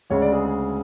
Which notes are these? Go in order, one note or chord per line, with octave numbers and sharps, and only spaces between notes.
D2 C#3 G#3 C#5
D5
G#4
G#4